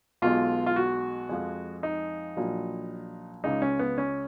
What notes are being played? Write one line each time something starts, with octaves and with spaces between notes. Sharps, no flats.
B1 B2 G#3 F4
F4
F#4
F2 F3 G#3
D#4
A#1 A#2 F#3
C#2 C#3 G#3 D#4
C#4
B3
C#4